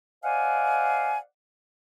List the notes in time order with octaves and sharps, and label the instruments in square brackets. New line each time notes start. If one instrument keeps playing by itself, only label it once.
[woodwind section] C5 D5 D#5 F5 F#5 G#5